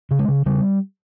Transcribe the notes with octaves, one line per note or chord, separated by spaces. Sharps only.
C#3
G#3
C#3
C#3 G3